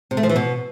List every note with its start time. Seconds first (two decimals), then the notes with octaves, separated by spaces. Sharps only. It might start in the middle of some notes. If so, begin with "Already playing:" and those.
0.11 C3
0.17 A3
0.23 F3
0.29 E3
0.36 B2